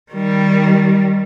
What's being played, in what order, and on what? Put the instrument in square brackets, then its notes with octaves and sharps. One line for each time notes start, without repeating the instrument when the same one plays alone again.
[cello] D#3 G3